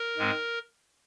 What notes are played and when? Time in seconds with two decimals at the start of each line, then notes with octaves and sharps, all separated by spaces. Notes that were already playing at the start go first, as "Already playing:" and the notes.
Already playing: A#4
0.18 G#2 G#3 C4